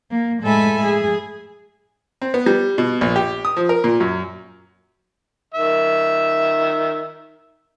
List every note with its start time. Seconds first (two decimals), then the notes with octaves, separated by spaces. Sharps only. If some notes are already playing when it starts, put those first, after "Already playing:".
0.11 A#3
0.42 A2 G#3 A4 E5 G#5 B5
0.83 G#4
2.22 C4
2.34 B3
2.46 G3
2.78 B2
3.01 A#1
3.16 G4
3.45 D#6
3.56 F3
3.69 A#4
3.84 A#2
4.00 F#2
5.54 D#3 E5